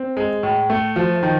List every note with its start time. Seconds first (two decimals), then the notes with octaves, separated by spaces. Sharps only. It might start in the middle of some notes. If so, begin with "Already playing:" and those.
Already playing: C4
0.17 G#3
0.43 A2
0.70 A3
0.96 F3
1.23 D#3